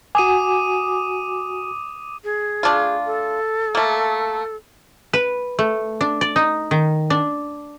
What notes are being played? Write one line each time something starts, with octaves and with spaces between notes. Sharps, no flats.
F#4 G#5 D6 D#6 D#7
G#4
A3 D4 F4
A4
A3 A#3
B4
A3
D4
D5
D#4
D#3
D4